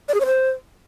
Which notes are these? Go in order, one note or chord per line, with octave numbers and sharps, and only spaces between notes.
D5
G#4
C#5
C5